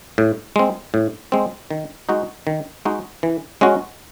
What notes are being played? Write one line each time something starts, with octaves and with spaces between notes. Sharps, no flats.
A2
G#3 C4
A2
G#3 C4
D#3
G#3 D#4 F#4
D#3
G#3 D#4 F#4
E3
G#3 C#4 F#4